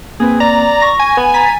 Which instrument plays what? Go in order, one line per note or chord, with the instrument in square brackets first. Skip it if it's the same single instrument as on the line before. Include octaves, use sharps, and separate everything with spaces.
[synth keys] A#3 C4 B4 [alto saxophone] G#4
[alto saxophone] D5 [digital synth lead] A#5
[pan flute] C#6 [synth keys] A#6
[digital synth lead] G#5
[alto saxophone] B3
[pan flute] A#5 [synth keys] A6 B6